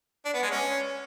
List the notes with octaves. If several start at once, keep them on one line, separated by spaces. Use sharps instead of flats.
D4
B3
G#3
C#4